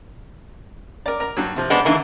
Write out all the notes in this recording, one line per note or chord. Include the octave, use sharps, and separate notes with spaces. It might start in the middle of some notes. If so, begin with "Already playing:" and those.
A#4 D5
A#4 A#5
G2 F#3
C3 F3
G#3 B3 D4
D#2 D3 E3 A#3